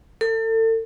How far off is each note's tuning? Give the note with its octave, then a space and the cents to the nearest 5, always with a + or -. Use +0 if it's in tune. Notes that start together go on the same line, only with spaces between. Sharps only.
A4 +35